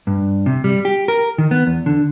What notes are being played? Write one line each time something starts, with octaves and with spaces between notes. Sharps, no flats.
G2
C3
G3
G4
A#4
D#3
B3
E2
D3